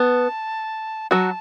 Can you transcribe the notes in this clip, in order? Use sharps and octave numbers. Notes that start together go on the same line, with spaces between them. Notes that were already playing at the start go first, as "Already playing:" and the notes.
Already playing: B3 A5
F#3 F#4 A5